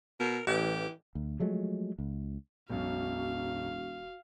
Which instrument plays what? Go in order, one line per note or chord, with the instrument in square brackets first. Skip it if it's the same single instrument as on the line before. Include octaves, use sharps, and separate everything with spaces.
[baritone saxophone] B2 [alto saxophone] A#4
[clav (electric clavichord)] A1 [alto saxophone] E3 [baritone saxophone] G4
[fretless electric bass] D2
F3 F#3 G#3 A3
C#2
[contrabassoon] E1 [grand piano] B1 F#2 [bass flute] F#4 [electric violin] F5